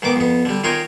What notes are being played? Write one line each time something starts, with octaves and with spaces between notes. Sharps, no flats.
G#2 D#3 B3 D6
F2 B3
D3 G3
D#3 F4 A#4 C#5 G5 G#5